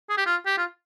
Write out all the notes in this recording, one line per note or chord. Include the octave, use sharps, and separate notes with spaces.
G#4
G4
F4
G4
F4